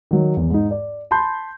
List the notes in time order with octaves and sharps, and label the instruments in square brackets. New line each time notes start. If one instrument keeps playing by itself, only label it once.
[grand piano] D#3 F#3
E2
G#2 D#4
D5
A5 B5 C6 G6